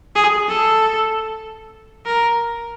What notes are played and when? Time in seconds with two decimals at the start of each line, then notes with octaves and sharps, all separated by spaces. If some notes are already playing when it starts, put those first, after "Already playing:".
0.15 G#4
0.48 A4
2.06 A#4